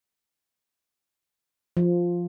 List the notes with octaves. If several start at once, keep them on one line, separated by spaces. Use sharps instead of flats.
F3